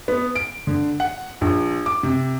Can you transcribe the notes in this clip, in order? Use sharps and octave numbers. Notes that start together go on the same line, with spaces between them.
B3
D7
D3
F#5
A#1
D6
C3